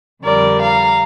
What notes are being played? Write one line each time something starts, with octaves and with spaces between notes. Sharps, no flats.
F2 D3 G3 A#4 D5
F5 A#5